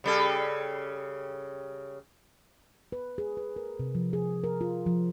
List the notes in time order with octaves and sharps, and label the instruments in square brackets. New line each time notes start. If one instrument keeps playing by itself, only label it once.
[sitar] C#3 G3 A4
[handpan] B4
G#4
B4
A#4
C3
F3
G#4
A#4
F4
F3